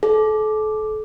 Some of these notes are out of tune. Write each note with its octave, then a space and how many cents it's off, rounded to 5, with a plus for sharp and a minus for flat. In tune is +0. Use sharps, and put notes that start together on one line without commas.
A4 -35